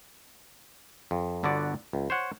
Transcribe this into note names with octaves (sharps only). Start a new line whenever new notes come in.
F2
G1 D3 B3 F#4 D5
C#2
C5 C#5 F#5